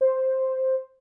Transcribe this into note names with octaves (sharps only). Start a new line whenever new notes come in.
C5